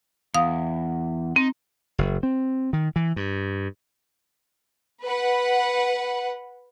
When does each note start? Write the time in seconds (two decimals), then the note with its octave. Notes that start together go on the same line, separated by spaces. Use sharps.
0.34 E2 F5 D#6
1.36 C4 D#4
1.98 F#1
2.23 C4
2.73 D#3
2.96 E3
3.16 G2
5.03 B4 F#5